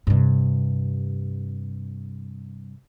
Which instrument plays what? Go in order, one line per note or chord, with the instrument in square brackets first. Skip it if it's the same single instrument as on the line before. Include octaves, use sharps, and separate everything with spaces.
[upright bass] G2 C3